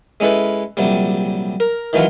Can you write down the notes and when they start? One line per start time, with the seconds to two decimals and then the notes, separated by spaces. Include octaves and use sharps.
0.20 G#3 C#4 E4 A4 B4
0.77 A#1 C3 F#3 G3
1.60 A#4
1.93 D#3 E3 F#3 C#4 F4